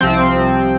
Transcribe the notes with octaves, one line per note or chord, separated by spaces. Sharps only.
C2 C3 F3 C4